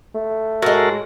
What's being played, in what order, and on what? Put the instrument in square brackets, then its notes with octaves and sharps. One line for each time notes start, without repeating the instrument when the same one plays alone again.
[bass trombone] A3
[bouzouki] A2 G#3 [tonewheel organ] F#4 A4 A#4